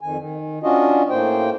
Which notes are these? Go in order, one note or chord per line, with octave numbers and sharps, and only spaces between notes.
F2 D#3 G#5
D#3
C#4 D4 F4 F#4 D#5
A2 A#3 C5 G5